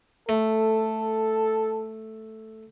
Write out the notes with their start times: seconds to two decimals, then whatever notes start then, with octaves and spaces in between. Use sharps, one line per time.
0.29 A3 A4